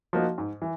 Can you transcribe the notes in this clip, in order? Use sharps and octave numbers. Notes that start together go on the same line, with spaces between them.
F3 A#3 D#4 F#4
G#2
E3